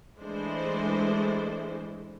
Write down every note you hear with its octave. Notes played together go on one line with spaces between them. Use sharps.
E3 G#3 A3 D4 E4 C5